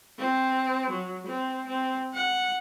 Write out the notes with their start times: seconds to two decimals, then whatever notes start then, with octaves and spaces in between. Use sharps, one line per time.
0.18 C4
0.90 F#3
1.26 C4
1.67 C4
2.14 F#5